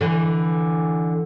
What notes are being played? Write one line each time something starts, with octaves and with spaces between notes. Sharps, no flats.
D3 E3